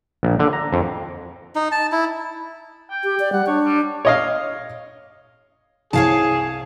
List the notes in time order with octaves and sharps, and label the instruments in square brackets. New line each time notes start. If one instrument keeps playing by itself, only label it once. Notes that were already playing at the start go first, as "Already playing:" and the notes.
[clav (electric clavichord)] A#1
D3
A#5
F2
[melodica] D#4
A5
E4
[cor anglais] G5
[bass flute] G4
D5
[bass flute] G3 [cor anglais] F#5
[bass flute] D4 [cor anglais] C#5
[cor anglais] G3
[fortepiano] C#5 D#5 F5
[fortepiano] C2 [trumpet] G#4 [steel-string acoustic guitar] C#5 F5 A5